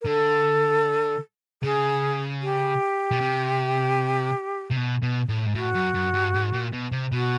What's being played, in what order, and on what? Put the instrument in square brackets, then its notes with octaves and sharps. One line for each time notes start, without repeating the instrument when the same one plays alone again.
[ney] A#4
[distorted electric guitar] D3 [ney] A4
[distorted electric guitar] C#3 [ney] G#4
[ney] G4
[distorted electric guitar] B2
C3
C3
B2
B2
A2
G#2
[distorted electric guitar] A2 [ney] F#4
[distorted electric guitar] F#2
F#2
G2
G#2
A#2
B2
C3
[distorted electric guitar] B2 [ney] F#4